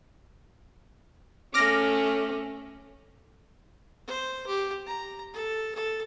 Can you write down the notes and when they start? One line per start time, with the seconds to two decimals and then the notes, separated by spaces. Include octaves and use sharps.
1.54 A3 C#4 D6 F6 A#6
4.07 C5
4.47 G4
4.86 A#5
5.33 A4
5.75 A4